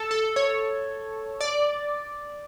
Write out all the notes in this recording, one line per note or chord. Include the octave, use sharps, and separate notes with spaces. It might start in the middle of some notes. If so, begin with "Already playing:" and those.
Already playing: A4
A4
C#5
D5